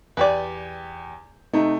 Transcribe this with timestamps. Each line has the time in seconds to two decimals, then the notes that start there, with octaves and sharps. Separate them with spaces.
0.17 E2 G4 B4 D5 G#5
1.53 C3 A3 D#4